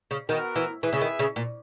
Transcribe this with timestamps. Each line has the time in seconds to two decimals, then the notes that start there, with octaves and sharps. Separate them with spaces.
0.11 C#3
0.29 D#3 B3 F#4 A#4
0.56 E3
0.83 E3 E4 G#4 B4 E5
0.93 C#3
1.01 D#3
1.19 C#3
1.36 A#2